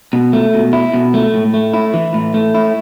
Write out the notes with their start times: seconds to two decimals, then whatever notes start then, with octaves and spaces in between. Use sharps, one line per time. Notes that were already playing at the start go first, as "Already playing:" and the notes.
0.13 B2
0.33 A3
0.54 B2
0.73 E4
0.94 B2
1.14 A3
1.34 A2
1.54 A3
1.74 E4
1.94 E3
2.14 A2
2.34 A3
2.55 E4